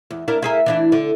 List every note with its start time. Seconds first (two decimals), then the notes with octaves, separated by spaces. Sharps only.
0.10 E2
0.28 D4 E4 A#4
0.42 E4 G#4 A#4
0.66 E3 D4 E4
0.92 D3